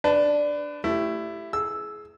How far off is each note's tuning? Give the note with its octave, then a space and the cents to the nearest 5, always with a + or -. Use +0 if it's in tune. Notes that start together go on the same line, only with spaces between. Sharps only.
D4 +0 B4 +30 A5 +0
A3 +0 E4 +15 G4 +0
G#4 +25 E6 +0